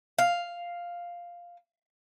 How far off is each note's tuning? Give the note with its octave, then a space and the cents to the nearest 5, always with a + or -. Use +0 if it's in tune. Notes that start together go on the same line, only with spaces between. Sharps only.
F5 +0